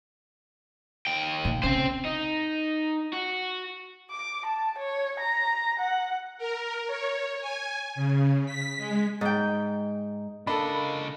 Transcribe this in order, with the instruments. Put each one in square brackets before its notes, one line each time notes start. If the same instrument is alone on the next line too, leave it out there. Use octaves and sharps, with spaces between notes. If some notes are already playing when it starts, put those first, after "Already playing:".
[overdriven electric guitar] D#2 G5
[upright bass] A#2
[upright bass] C#3 [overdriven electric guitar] C4 C5
[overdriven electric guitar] D#4
F#4
[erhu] D6
A5
C#5
A#5
F#5
[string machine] A#4
C#5
G#5
C#3
B6
G#3
[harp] G#2 G5
[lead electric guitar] C#3 D#5 [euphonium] A#3 [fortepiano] D4 A4 [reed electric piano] B5